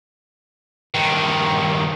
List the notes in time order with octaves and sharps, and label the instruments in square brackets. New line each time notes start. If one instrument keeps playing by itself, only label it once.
[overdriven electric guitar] G2 D#3